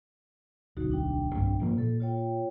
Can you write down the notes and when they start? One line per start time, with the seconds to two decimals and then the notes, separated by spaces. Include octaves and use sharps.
0.77 D1 B1 D#4 F#4
0.91 D4 G5
1.35 B1 G2 A3
1.60 G#2 F3 A#3
1.78 A#2 A4
2.00 F4 C#5 G5